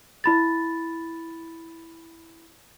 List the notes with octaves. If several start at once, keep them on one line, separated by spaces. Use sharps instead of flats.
E4 B5 A6